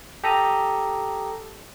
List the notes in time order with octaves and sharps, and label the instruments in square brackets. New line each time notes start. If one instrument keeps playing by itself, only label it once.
[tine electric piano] G4 A4 A#5 D#6